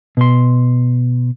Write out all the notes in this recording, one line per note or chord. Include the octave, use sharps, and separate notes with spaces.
B2 C6